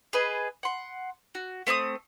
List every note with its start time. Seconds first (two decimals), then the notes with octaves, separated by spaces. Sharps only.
0.13 G#4 B4 D#5
0.63 F#5 C6
1.35 F#4
1.67 A3 C4 A#5 D#6